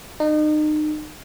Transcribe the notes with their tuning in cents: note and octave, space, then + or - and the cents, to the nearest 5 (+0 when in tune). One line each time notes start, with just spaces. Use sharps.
D#4 -35